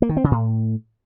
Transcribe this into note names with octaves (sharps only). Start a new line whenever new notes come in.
A#3
D#3
C4
C#3
A2